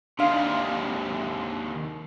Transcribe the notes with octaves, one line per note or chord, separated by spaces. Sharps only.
D#2 C3 D4 F5 C6